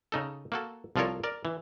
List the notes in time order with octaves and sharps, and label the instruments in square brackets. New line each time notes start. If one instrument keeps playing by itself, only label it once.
[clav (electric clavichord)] C#3 D#4 A4
A#3 F#4 A4
C2 F3 F4 A4 A#4 C#5
A#4 D5
E3